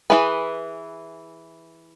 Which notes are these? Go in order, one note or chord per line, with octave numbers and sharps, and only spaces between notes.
E3 B3 E4 G#4 B4